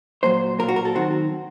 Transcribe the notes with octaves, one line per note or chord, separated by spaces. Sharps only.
A#2 F#3 A#3 C5
A#2 F#3 A#3 A#4
F#4
A#4
A4
D#3 F#3 C4 F#4